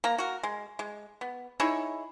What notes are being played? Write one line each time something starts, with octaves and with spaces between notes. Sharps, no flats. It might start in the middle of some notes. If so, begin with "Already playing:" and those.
A#3 A#5
F#4 A#4
G#3
G#3
B3
D#4 E4 G#4 C#5